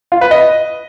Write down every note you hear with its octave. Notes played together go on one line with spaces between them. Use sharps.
F4
B4
D#5